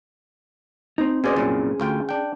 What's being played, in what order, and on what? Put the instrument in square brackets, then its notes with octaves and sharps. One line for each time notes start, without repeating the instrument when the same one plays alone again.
[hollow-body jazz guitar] C4 D#4
[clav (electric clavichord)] B2 D5 D#5 [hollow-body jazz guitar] C#4 G#4 C5
[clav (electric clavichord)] C2 F#2 A#2
D2 F4 G5
D4 G5